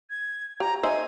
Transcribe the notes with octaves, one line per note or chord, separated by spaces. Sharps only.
G#6
G4 A#5
D#4 C5 E5 G#5